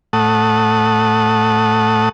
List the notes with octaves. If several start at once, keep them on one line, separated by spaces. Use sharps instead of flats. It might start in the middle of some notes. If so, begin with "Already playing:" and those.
A2 A3 F#5 A5 D#6